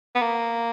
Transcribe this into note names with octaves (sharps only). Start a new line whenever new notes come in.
B3
A#3